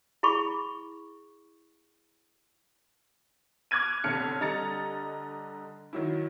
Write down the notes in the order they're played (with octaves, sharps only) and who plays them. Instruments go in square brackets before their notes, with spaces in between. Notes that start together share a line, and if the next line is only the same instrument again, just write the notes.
[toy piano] E4 G#4 B5 C#6
[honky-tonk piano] D6 F6 F#6 G#6 D#7
F1 B1 D3 F6 C#7
D3 G3 D#5 A#5 A6 C#7
D#3 F#3 E4